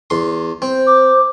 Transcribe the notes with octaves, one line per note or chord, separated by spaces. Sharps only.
E2 C6
C4 C5
D6